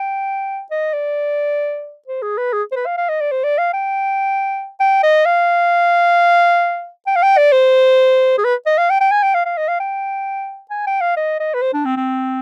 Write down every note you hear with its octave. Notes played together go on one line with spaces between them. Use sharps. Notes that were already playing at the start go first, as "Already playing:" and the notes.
Already playing: G5
D#5
D5
C5
G#4
B4
G#4
C5
B4
F5
F5
D#5
D5
C5
D5
F5
G5
G5
D#5
F5
G5
F5
G5
D5
C5
G#4
B4
D#5
F5
G5
G5
G#5
G5
F5
F5
D#5
F5
G5
G#5
G5
F5
D#5
D#5
B4
C5
D4
C4
C4